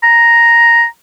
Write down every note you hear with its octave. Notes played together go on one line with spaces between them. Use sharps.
A#5